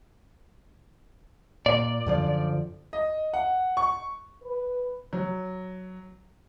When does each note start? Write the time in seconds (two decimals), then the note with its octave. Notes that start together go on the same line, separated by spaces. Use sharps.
1.66 A#2 D5
2.06 F#2 D3 F3
2.93 D#5
3.34 F#5
3.77 C#6
4.42 B4
5.13 F#3